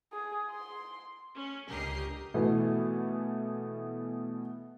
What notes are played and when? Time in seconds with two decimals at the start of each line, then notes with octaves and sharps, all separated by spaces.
0.12 G#4
0.50 C6
1.34 C#4
1.69 C#2 D3 G4 A#4 D#5 C7
2.34 B2 E3 A3 B3